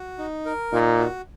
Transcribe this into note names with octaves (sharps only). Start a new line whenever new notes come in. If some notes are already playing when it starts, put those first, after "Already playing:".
Already playing: F#4
D#4
A#4
A#2 D#4
F#4